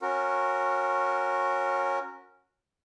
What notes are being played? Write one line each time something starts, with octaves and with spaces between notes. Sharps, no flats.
C#4 F#4 A#4